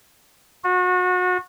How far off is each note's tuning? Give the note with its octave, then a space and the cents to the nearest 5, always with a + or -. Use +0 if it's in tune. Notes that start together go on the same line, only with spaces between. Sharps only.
F#4 -30